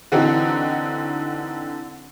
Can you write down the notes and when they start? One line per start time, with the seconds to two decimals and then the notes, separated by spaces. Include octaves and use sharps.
0.12 D3 E3 C4 D#4 F#4